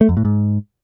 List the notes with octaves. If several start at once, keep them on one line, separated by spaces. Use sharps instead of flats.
A3
F2
A2
G#2